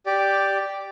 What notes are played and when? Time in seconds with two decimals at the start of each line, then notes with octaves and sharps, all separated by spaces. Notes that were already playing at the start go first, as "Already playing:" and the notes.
0.06 G4 D5